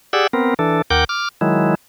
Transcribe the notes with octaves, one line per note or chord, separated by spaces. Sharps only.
G4 G#4 D5 F#5 E6
B3 C4 A#4
E3 D4 A4
D#2 A#4 F#5 G5 D6 G6
D6 F6
D#3 F#3 G#3 E4